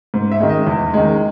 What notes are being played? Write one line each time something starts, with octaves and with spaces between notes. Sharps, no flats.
G#2
E5
D#3 G#3
D#5
E2
D#3 G#3